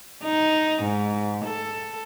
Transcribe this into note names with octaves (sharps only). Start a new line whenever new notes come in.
D#4
G#2
A4